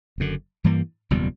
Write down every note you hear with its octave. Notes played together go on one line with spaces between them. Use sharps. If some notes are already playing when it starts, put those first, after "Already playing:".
F#1 F#2 D3
G2 E3 G3 A#3
F#1 E2 B2 G3